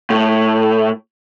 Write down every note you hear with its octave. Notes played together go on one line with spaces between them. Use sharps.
A2